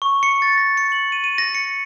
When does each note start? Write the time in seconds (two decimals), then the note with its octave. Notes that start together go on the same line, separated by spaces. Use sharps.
0.02 C#6
0.23 C#7
0.42 A6
0.58 A#6
0.77 C#7
0.92 F#7
1.12 D#7
1.24 D#7
1.38 A#6
1.55 C#7